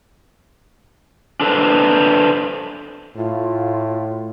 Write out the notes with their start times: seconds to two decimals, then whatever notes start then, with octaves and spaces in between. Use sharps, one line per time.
1.41 D4 A4 B4 C5
3.16 A2 F4